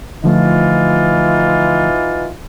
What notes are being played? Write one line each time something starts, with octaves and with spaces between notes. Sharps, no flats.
D3 E3 F3 A3 D#4 F4